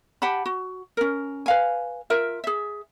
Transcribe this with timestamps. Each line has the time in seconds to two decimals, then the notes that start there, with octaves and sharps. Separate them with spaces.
0.22 G4 F#5 A5 B5
0.46 F#4
0.97 C#4 A#4
1.46 B4 F5 G#5
2.10 F4 A#4 E5
2.44 G#4 E5